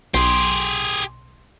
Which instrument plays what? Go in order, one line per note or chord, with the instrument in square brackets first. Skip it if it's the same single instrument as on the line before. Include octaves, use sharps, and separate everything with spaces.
[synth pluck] B1 [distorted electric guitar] G4 G#4 [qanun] C6